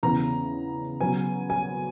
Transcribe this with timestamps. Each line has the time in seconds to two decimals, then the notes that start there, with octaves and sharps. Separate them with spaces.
0.03 E2 C#3 E3 B3 A#5
1.01 C#3 F#3 B3 G#5
1.50 G#5